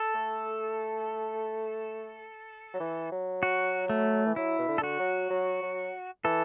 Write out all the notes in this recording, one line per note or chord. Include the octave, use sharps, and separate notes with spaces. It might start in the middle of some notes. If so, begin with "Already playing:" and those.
Already playing: A4
A3
F#3
E3
F#3
F#4
A3
E3
F#3 E4
B2
D3
A4
F#4
F#3
F#3
F#3
E3 A4